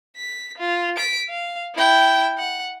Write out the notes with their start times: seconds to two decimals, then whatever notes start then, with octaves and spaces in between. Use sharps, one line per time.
0.17 B6
0.58 F4
0.97 B6 D7
1.29 F5
1.75 E4 G5
2.38 F#5